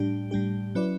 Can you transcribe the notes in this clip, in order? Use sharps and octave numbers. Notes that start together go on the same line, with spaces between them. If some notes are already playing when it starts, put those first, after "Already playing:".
Already playing: A2 G3 D4 G4
A2 G3 D4 G4
F#3 C#4 E4 B4 D5